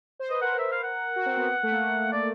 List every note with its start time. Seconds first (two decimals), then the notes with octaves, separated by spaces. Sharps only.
0.19 C5
0.30 B4 D#5
0.41 A#4 F#5
0.59 E5
0.72 F5
0.83 F#5
1.16 F#4
1.26 C4
1.37 B3
1.47 B3
1.63 A3
1.72 A#3
2.12 D5